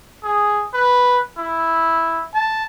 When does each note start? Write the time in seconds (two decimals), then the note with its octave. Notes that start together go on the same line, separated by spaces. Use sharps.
0.24 G#4
0.74 B4
1.38 E4
2.34 A5